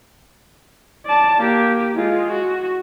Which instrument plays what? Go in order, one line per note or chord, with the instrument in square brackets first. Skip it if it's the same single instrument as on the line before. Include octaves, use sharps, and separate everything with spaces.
[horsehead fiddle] D5 A5
A#3 G4
G#3 F4
F#4